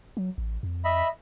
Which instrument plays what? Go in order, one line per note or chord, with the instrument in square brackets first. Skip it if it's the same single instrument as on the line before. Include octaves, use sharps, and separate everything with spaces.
[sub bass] F#3
A1
F2
[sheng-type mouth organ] D#5 E5 B5